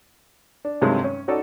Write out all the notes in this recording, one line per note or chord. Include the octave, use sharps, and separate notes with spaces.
D4
G2 C3 D#3 F#3 G#3
C#4
C#4 D#4 F#4 A4 D5